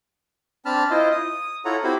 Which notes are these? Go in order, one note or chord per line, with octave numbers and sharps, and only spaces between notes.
C4 D4 A5 B5 F6
E4 F4 C5 D#5
D#6
E4 F4 A4 C#5 F#5 A#5
C4 E4 F#4 G4 C5 B5